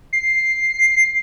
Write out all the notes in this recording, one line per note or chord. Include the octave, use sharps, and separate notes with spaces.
C7